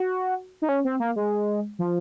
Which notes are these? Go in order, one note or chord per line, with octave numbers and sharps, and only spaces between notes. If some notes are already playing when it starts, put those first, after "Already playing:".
Already playing: F#4
D#4
C#4
C4
A#3
G#3
F3